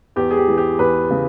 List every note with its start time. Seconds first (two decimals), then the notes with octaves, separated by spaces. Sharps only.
0.16 E2 G4
0.31 G#4
0.37 G4
0.48 E3
0.58 G4
0.79 E2 B4
1.10 C#3